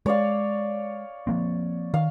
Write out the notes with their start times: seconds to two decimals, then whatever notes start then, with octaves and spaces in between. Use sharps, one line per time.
0.06 G#3 C#5 D5 F5
1.27 F3 A#3 C4
1.94 D#3 F5